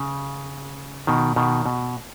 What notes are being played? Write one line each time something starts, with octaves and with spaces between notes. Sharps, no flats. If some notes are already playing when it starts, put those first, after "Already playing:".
Already playing: C#3
B2 D#3
B2 D#3
B2